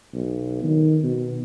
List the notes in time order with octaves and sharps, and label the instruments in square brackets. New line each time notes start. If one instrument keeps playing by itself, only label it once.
[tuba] B1
D#3
B2